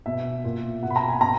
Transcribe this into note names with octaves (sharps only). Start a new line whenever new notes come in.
B2 E5
A#2
B2 F#5
B5
A#5
G#5
B2 A#5